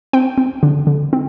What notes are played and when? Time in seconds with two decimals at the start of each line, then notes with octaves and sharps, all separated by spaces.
0.13 C4 G5
0.38 C4
0.63 D3
0.87 D3
1.13 C4